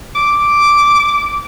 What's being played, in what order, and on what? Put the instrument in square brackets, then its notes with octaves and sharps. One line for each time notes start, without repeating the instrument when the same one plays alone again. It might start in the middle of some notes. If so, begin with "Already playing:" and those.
[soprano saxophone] D6